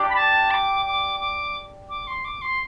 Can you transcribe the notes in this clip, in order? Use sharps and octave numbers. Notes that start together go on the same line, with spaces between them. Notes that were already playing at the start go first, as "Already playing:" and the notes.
Already playing: D4 G4 D5
B5
A5
D6
D6
D6
D6
C6
D6
C6